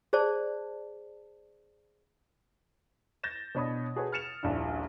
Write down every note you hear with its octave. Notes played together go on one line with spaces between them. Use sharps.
G#4 C5 D5 A5
G6 A6 A#6 E7
B2 D4 C#5 B5 D#6
F#4 G#4 A4 B4 C#5
F6 A6 C#7 E7 F7
D#1 A#1 D4 E4